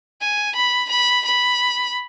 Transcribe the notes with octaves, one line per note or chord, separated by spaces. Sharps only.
G#5
B5
B5
B5